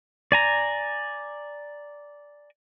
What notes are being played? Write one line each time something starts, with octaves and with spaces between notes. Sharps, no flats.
D5 G#5 A#5